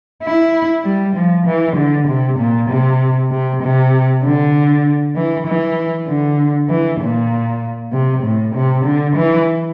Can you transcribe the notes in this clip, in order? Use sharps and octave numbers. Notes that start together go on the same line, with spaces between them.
E4
G3
F3
E3
D3
C3
A#2
C3
C3
C3
D3
E3
E3
D3
E3
A#2
C3
A2
C3
D3
E3